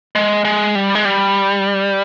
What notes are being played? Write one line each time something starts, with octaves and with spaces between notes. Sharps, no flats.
G#3
G#3
G3
G#3
G3